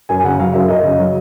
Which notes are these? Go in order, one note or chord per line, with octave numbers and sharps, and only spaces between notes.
F#2 G#5
C#3 F#5
F#3 F5
F#2 E5
F#2 D#5
C#3
F#3